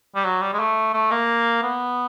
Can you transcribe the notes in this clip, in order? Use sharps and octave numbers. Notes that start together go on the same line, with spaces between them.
G3
F#3
G3
G#3
A3
A3
A#3
B3